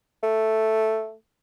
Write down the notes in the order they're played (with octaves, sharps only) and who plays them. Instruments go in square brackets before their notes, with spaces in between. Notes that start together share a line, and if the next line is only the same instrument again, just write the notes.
[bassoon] A3